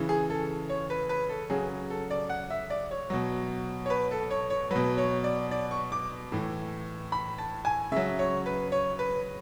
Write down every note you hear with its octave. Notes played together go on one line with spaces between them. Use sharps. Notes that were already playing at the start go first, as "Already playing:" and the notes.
Already playing: C#3 E3
G#4
A4
C#5
B4
B4
A4
C#3 F#3 G#4
A4
D5
F#5
E5
D5
C#5
B2 F#3
C#5
B4
A4
C#5
C#5
B2 F#3 B4
C#5
D5
D5
C#6
D6
A2 E3
B5
A5
G#5
C#3 F#3 E5
C#5
B4
C#5
B4